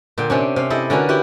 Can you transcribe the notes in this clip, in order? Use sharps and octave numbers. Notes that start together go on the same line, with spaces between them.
A#2 D3 G5
C3 C#4 D4
C3 F5
E4 G4 A4 D#5
D3 C#4 F#4 A#4 B4
E4 F#4 G4